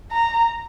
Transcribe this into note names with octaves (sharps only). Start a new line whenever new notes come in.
A#5